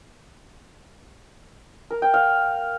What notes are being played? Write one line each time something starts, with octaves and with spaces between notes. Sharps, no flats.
A#4
G5
F5